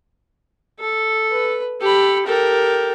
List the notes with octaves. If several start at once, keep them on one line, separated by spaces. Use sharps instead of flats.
A4
B4
G4 A4 B5
G4 A4 A#4